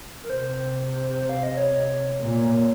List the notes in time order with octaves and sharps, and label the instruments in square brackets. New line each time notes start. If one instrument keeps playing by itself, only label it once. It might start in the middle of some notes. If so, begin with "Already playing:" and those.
[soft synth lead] A#4
[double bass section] C3 [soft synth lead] C5
[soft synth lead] F5
D#5
C#5
[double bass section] A#2